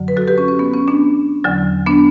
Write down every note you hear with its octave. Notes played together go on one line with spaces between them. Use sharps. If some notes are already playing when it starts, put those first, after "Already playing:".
Already playing: F#2 D3 F#3
B4
F#4 A4
G4 B4
C#4
C#4
B3
C#4
B3 D4
E2 D3 F#3
B3 D4